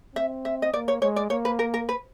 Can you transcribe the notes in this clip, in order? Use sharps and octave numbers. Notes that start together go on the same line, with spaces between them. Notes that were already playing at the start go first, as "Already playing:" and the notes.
C4 E5
E5
D#5
A#3 D5
C#5
G#3 C#5
D5
A#3 C#5
B4
A#4
A#4
B4